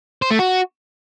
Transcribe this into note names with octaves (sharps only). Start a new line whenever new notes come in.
C5
A3
F#4